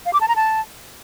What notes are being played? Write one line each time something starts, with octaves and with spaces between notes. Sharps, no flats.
F5
D6
A5
A#5
A5